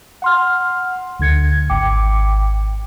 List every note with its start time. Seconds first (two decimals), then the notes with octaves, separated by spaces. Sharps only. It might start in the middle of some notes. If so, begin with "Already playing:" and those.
0.22 F#5 C6 F6
1.19 D2 D3 G#6 C#7
1.70 G#1 G5 D6 C#7